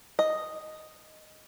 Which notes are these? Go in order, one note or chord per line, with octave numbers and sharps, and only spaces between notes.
D#5